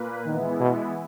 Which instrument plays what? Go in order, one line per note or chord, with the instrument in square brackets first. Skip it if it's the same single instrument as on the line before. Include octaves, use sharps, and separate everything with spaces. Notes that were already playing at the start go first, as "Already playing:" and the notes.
Already playing: [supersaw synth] A#2 A#3 B4
[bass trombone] D#3 [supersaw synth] E3 G#3 B3 E4
[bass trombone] B2